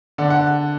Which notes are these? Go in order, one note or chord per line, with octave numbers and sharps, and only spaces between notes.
D3 D5 F#5
F#5